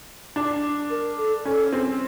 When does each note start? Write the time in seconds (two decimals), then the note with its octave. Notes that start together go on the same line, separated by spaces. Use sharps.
0.36 D4
0.90 A#4
1.18 A4
1.45 C#4 A4
1.73 C4